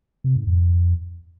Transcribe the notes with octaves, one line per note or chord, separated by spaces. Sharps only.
C3
G#2
F2